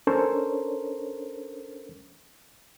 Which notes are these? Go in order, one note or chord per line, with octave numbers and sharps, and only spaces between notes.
C#4 D4 A4 A#4 C5 C#5